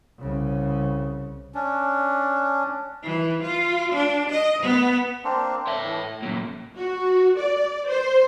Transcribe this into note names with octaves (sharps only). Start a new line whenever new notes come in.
C2 C#3
C#4 D4
E3
F4
D4
D#5
B3
A#3 C4 D4
D4 C#5 E5
E3
A2
F#2 A#2
F#4
D5
C5